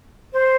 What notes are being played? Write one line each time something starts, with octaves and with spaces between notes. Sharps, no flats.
C5